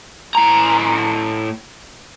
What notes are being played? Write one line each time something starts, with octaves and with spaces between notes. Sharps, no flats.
A2 A#5